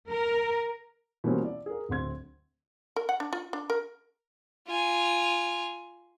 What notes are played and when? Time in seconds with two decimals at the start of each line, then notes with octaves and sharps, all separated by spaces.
0.11 A#4
1.24 B2 E3 G3 A#3 C4 C#4
1.41 E4 D5
1.66 G#4 A#4
1.89 D1 D2 C4 C6 G#6
2.96 A#4
3.09 F#5
3.20 D4
3.33 F4
3.53 D4
3.70 A#4
4.67 F4 G#5